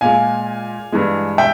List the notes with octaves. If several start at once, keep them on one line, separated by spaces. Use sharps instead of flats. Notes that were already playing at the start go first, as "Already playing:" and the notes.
A#2 G#3 F5 G#5
G2 E3 G#3
E5 G5